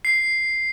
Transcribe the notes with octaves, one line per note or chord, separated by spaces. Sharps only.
C7